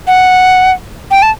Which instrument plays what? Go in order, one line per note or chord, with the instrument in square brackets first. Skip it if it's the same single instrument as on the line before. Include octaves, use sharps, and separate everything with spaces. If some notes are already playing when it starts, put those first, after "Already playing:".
[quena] F#5
G5
A5